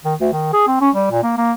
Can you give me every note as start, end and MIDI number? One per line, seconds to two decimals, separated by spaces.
0.05 0.15 51
0.21 0.30 38
0.33 0.50 51
0.53 0.67 68
0.68 0.78 60
0.81 0.90 61
0.95 1.08 55
1.11 1.23 46
1.23 1.36 58
1.38 1.52 58